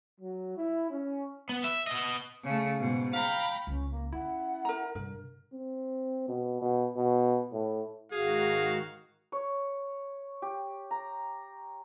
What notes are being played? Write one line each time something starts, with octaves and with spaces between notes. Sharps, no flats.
F#3
E4
C#4
B3
E5
B3 D#5
C#3 A3
G#2 B2
F5 G5 A#5 B5
C#2 C#4
A#3
C#4 E4 F#5
A#4 A#5
G2 C3 A#4
C4
B2
B2
B2
A2
G#2 D#3 F#4 G#4 F5
C#5
G4
A#5